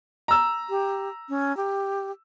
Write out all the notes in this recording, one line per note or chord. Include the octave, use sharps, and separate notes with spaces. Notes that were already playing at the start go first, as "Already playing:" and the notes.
A#5 E6
G4
C#4
G4